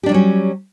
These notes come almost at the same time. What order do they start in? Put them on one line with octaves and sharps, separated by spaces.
G4 D4 G3 F#3 C#4